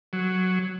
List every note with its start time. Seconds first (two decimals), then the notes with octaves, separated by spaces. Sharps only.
0.13 F#3